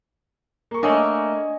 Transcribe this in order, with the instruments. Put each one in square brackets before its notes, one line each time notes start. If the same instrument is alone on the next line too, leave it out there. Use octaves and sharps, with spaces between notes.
[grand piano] A#3 C#6
[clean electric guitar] A3 A#3 [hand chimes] D4 [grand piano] C#5 D#5 G#5